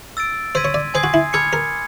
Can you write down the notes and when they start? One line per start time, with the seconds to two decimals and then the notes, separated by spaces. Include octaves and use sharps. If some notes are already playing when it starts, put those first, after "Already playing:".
0.17 E6 A6 D7
0.55 C5 C6 E6 G#6 B6 D#7
0.65 C#5
0.74 D5
0.94 C5 G#5 C6 D#6 G#6 C7
1.04 F#4
1.14 E4
1.33 A4 B5 D6 F6 G#6 C#7
1.53 A#4